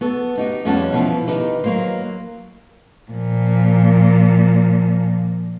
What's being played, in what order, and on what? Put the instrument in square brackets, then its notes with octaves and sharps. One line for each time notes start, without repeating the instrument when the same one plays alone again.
[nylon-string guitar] B3 F#4 A4
D#4 F#4 G4
F2 G3 B3 C#4 F#5 A5
B2 E3 F3 B3 C4
D#3 D#4 G4 B4
F#3 A#3 C5
[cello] A#2 F3